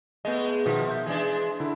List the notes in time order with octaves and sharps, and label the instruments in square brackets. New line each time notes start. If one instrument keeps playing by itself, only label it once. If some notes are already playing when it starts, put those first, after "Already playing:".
[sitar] G#3 A3 [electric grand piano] B3 D#5
[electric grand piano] B2 D#3 [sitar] F3
[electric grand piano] E5 G6
[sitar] E3 G#3 D4 [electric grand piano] G#4
[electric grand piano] D3 E4